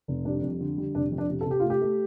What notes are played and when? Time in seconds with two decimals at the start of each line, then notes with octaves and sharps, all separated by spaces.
0.08 F1
0.25 G3 D4
0.43 F2
0.60 D3
0.78 G3
0.95 F1 D4
1.12 F2
1.18 D4
1.30 C3
1.41 A4
1.46 C3 G4
1.60 A3 F4
1.70 G4
1.82 A3